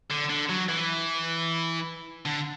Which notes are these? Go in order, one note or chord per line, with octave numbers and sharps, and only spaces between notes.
D3
D3
F#3
E3
D3